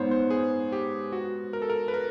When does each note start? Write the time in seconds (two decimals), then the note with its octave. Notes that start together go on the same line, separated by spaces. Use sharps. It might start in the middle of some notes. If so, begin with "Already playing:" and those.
Already playing: G#2 B3 C5 C#5
0.11 C5
0.30 G#4
0.72 G4
1.12 F#4
1.53 A#4
1.62 A4
1.70 A#4
1.88 B4
1.94 A#4